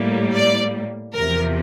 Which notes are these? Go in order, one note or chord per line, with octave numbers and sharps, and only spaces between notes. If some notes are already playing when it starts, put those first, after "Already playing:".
Already playing: A2 G3 A#3
D5
E2 C3 F3 A#4